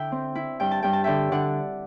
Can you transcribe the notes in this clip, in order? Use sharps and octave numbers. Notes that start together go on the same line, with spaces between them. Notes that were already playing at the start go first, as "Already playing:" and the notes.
Already playing: D3 D4 E4 D5 E5 G5
C4
E4
G2 G5
A5
G2 G5
A5
D3 E5 G5
D3 D5 F#5